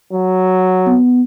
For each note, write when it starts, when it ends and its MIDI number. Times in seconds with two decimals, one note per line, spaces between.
0.13 0.97 54
0.87 1.22 59